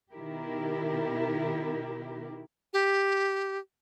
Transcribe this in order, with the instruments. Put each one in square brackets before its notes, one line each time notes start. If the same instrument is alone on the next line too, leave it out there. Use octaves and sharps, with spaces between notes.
[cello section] B2 D#3 E4 G4 A#4
[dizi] G4